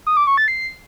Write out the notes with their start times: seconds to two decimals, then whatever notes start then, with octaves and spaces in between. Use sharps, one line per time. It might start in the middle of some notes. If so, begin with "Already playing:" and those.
0.07 D#6
0.17 D6
0.27 C#6
0.37 A6
0.48 C7